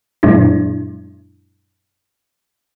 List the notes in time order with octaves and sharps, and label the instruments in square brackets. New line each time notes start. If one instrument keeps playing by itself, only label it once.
[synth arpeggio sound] F#2 A#2 F#3 G#3 D4 E4